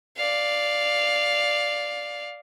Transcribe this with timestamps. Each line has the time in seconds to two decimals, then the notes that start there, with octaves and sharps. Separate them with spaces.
0.17 D5 F5